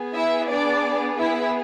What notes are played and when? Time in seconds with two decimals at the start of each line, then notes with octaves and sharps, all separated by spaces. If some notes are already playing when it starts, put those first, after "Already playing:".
Already playing: B3 G#4
0.15 E4 E5
0.49 D4 D5
1.20 E4 E5